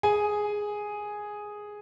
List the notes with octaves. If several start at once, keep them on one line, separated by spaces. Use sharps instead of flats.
G#4 G#5